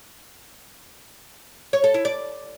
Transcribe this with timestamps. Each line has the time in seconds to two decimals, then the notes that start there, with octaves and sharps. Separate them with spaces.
1.73 C#5
1.84 A4
1.94 E4
2.05 D5